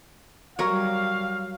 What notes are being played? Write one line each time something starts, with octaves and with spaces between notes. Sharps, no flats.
F#3 G3 A#4 C#5 F5 A#5 C#6